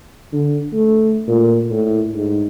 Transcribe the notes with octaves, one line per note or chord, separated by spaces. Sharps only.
D3
A3
A#2
A2
G#2